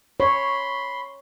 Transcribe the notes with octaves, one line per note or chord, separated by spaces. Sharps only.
C#5 B5 C6